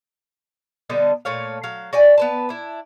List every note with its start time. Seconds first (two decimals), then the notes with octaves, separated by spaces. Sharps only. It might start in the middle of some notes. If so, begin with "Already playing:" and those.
0.90 D3 G3 B3 D#4
1.25 A#2 A3 C#5 F5
1.64 F#3 F5
1.93 F#4 D5 G5 G#5
2.18 B3 B4 A5
2.49 D4 E4